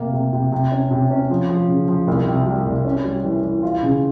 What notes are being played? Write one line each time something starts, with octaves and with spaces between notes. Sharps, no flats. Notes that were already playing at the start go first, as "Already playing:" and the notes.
Already playing: C3 A#3
C3
C3
C3
C#4
C3
C#4
F3
F3
C#3
F3
C2
C3
G3
C2
C#4
G3
E3
E3
F4
C#3